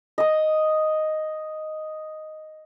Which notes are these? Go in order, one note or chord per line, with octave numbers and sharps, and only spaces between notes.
D#5 D#6